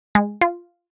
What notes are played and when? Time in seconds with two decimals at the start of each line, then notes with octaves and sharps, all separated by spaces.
0.15 G#3
0.41 F4